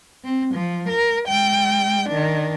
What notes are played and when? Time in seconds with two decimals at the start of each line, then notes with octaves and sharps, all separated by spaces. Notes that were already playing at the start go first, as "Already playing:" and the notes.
0.25 C4
0.55 F3
0.89 A#4
1.28 G#3 G5
2.09 D#3 D4